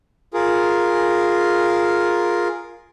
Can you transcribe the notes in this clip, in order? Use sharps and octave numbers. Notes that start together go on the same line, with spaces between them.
F4 G#4 A#4